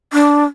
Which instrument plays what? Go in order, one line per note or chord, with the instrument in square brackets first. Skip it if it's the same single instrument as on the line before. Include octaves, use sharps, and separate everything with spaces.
[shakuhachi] D4